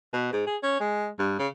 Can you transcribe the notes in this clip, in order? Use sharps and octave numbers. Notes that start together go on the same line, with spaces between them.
B2
G#2
G#4
C#4
G#3
G2
C#3